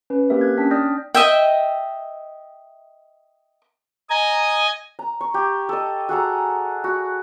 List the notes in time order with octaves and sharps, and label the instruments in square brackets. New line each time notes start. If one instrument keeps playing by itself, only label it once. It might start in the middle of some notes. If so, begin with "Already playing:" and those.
[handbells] C#4 B4
A#3 C4 G4 A#4 E5
F#6 G#6
C#4 D4 G5 A5 B6
D5 G5 D#6 F6 G6 A#6
[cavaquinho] D#5 E5 G5
[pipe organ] D#5 G#5 [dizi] A#5
[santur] A#5
C#6
G4
A4 D#5
F#4 G#4 A4 A#5
F#4